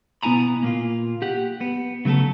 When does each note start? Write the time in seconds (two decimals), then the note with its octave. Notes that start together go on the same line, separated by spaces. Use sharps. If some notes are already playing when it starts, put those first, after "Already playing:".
0.23 B2 B3 E4 G#5 A#5 B5
0.63 A#2 A#3 F4
1.22 G4 F#5
1.61 B3
2.05 C#3 F#3 A3 B3 A4